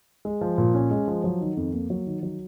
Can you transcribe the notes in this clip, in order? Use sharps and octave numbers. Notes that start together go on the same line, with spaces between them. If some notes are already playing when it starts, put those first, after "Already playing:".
G#3
F3
A#2
C#4
G#3
F3
F#3
D#3
F2
A#3
F#3
D#3
F#3